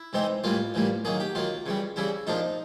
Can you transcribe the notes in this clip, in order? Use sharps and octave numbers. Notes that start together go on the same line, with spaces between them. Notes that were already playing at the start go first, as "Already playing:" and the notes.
Already playing: E4
C3 E3 G#3 C4 D#4
A2 E3 G3 A#3 F4
A2 E3 G3 A#3
D#3 F#3 A#3 G#4
G4
D#3 F#3 A#3 F4
C#3 E3 G3
C#3 E3 G3 E4
A#2 F3 A#3 D4 D#4